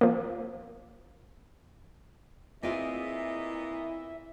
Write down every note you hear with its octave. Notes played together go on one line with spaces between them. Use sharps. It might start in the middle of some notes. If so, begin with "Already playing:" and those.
F3 A#3
A#2 B3 C4 E4 F4 G#4 D#5 E5